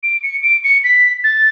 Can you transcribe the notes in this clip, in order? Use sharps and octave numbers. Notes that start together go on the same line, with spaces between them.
D7
C#7
D7
C#7
B6
A6